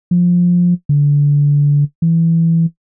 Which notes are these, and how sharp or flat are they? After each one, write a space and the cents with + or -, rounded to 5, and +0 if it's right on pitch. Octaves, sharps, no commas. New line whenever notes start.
F3 +15
D3 -25
E3 +5